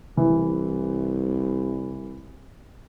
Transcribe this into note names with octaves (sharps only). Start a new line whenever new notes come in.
C2 E3